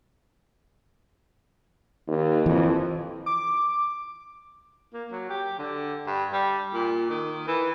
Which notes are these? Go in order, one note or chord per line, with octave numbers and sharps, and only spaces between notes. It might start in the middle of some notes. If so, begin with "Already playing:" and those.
D#2
F2 E3
D6
A#3
F#3
G4
D3
G2
G3
A#2
D#3
E3